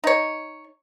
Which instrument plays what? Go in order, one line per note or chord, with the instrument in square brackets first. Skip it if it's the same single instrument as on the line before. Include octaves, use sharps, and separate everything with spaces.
[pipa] D#4 C#5